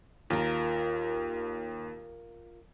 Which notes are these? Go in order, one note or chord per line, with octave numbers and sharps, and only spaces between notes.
D#2 F4 A#4